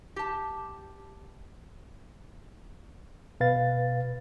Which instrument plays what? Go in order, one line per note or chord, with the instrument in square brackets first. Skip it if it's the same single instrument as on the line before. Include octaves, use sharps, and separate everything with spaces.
[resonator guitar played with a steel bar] G4 A5
[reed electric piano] B2 B4 F5 A6